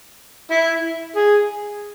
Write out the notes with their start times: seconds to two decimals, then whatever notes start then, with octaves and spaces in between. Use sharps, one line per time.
0.51 E4
1.16 G#4